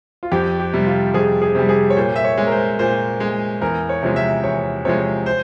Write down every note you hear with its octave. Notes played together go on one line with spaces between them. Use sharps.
F4
F2 G4
G4
C3 G3
F4
F2 G#4
G#4
C3 G3
G#4
C#5
A#2 C5
E5
C#5
G#3
A#4
C5
A#2 C5
G#3
E2 A#4
C#5
C3 F3 G#3
E5
E2 C#5
C3 F3 G#3 C#5
C5